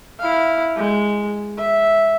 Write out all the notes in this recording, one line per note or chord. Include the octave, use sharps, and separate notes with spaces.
E4 F5
G#3
E5